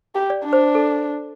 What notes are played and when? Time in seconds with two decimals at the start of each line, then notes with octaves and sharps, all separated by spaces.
0.15 G4
0.30 D5
0.44 D4
0.53 C5
0.75 A4